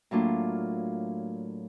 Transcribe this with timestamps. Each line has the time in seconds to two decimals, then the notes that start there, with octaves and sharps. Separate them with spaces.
0.11 A2 F#3 A#3 D4 F4